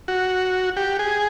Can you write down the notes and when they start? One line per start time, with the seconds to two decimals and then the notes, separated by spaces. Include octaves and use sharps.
0.08 F#4
0.77 G4
0.99 G#4